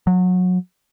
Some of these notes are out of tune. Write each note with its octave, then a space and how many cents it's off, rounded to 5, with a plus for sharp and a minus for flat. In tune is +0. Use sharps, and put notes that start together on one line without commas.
F#3 -25